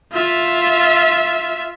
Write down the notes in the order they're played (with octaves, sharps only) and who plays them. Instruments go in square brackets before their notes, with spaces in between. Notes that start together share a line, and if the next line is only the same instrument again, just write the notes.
[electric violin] F4 E5